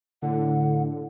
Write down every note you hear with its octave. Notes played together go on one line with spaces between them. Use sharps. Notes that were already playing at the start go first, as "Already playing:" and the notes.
A2 D3 F#5